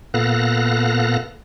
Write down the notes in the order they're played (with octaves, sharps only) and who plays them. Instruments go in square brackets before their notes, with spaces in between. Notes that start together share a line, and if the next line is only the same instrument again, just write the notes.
[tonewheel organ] A#2 B3 A4 F5 F#6 A#6